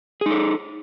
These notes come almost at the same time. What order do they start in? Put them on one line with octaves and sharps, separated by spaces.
G#4 D#4 A4